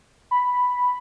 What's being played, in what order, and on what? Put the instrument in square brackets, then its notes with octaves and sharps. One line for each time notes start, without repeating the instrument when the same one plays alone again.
[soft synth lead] B5